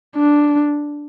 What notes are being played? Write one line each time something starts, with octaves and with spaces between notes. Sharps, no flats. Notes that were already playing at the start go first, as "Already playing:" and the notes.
D4